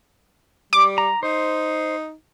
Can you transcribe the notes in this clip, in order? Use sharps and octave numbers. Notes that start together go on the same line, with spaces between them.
G3 D6
A#5
D#4 C5